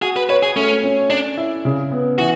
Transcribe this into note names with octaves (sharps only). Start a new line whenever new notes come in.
F#4 G#4
B4
B4 C#5
G#4
A3 C#4
C#4
D4 D5
E4
C#3
B3
E3 F#4